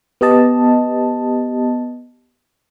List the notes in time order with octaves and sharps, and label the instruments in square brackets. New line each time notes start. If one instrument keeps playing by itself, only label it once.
[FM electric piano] B3 G4 D#5 A5